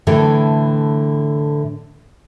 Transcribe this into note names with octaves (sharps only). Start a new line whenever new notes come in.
A2 D3 E3 E4 A4